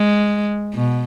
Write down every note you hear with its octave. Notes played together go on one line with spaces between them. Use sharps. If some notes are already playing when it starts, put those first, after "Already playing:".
Already playing: G#3
B2